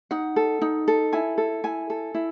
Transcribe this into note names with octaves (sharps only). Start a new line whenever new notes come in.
D#4 F#5
A4
D#4
A4
E4 G#5
A4
E4 G#5
A4
E4